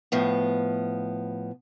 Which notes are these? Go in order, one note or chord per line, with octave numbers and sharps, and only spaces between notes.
A2 F3 B3